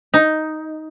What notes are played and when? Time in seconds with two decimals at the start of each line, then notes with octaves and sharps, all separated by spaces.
0.14 D#4